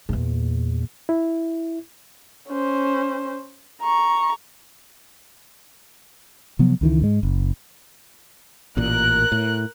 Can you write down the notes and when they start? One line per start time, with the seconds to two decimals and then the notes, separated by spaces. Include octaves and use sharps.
0.09 E2 A#2
1.09 E4
2.48 C#4 C5
3.82 A#5 C#6
6.59 C3 F3 F#3 B3
6.81 C#2 D#3 E3
7.02 G#2 G#3
7.23 F#1
8.77 A1 A#2 A#4 F#6
9.32 A2